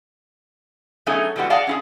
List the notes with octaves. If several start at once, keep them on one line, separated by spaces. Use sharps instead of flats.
F#3 A3 B3 C#4 D#4 G#4
E3 G3 G#3 B3 F#4
G#4 D5 D#5 F5 F#5 A5
C#4 E4 G#4